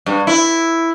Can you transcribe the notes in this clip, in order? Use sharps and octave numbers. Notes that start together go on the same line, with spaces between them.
G2
E4